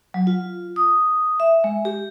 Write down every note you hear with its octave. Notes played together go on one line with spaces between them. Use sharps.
F#3
F4
D#6
E5
G#3
G4